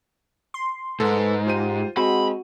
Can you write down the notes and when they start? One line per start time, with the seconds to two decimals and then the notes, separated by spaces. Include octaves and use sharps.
0.54 C6
1.00 G#2 A4 B4
1.47 F4 G4 C5 D#7
1.97 G#3 C4 F#4 B5